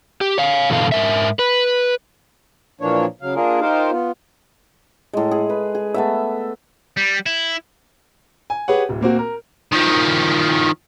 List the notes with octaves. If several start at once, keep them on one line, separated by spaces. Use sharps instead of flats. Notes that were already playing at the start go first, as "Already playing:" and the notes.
G4
C#5 F5
G2 B2 D3 E3 A4 F5
G#2 A#4 E5
B4
A#2 E3 F3 A#3 D4 C#5
C#3 F#3 F5
A#3 D4 F4 G#4 A#4
D#4 F4 G4 A#4 C5 F5
B3 F4
A2 G#3
G#4
B4
G#4
A3 B3 E5
G3
E4
G#5
G4 G#4 B4 C#5 F#5
D1
A#2 A#3 C4 F#4
A#4
D#3 F3